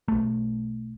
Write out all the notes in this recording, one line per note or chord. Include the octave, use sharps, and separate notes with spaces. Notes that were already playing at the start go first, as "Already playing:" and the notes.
B1 A3